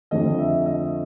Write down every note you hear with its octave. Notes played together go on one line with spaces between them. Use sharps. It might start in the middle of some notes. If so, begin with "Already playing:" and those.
F2 D3 F3 A3 D#5
E5
D#5